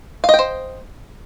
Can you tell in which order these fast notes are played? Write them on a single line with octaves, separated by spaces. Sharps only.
F5 D#5 G5 C5